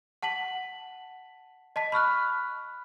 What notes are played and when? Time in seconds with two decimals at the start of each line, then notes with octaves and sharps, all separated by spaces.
0.22 F#5 A5 B6 F#7
1.76 D#5 A5 B6
1.92 B5 C#6 F6 F#6